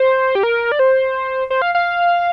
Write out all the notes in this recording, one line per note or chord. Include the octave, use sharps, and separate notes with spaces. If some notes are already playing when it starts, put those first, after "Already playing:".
Already playing: C5
G4
A#4
D5
C5
C5
F5
F5